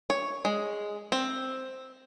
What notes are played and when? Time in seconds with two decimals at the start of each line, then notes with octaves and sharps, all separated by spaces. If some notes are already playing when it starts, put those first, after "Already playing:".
0.10 C#5
0.45 G#3
1.12 C4